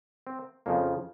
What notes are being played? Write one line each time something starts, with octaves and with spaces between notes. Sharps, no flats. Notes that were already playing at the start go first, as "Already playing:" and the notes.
C4
F2 C#3 F3 A#3